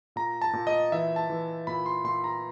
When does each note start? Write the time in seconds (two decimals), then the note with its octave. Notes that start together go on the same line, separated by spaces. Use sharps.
0.16 A#2 A#5
0.42 A5
0.53 A#2
0.67 D#5
0.92 E3 E5
1.16 A5
1.30 E3
1.67 A#2 B5
1.86 C6
2.04 A#2 C6
2.24 A#5